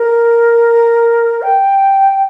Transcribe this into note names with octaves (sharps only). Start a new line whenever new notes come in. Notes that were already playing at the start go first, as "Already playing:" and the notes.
Already playing: A#4
G5